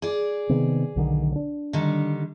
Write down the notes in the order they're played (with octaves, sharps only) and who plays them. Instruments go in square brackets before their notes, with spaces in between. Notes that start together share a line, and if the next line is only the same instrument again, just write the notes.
[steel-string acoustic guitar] G#4 D5
[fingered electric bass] C3 D#3 B3
B1 D3 D#3
D4
[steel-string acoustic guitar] D3 D#3 G3